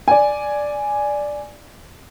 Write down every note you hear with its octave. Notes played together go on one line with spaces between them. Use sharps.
D5 G#5